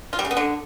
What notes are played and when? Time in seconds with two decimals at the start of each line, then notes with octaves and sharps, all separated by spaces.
0.13 F4
0.19 G3
0.25 C#3
0.31 B3
0.37 D3